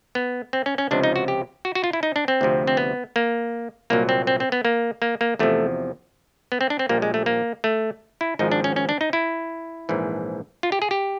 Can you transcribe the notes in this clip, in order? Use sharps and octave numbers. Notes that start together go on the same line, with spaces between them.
B3
C4
C#4
C#4
C#2 C3 F3 D4
D#4
F#4
G4
F#4
F#4
F4
E4
D#4
D4
C4
D2 C3 F3
C4
B3
A#3
C2 A#2 F#3 A#3
C4
C4
C4
B3
A#3
A#3
A#3
E2 C3 F3 A3
B3
C4
D4
C4
A#1 A#2 G3 A#3
G#3
A3
A#3
A3
E4
G#1 G#2 F3 D#4
D4
C#4
C#4
D4
D#4
E4
A#1 G#2 E3
F4
G4
G#4
G4